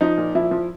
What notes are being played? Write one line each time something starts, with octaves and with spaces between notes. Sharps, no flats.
F3 D#4
A#2
F3 E4
F3